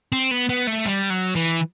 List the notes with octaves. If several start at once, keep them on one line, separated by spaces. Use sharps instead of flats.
C4
B3
B3
A3
G3
F#3
E3